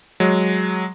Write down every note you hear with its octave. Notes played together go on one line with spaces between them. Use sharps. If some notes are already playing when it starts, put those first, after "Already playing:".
F#3 G#3